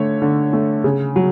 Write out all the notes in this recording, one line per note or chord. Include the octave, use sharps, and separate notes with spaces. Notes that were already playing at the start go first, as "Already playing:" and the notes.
Already playing: D3 A3 C#5
D3
A3
C#3
F#3